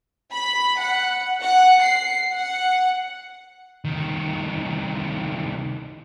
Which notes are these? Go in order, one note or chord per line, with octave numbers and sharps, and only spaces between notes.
B5
F#5
F#5
C7
F#5
C2 D#3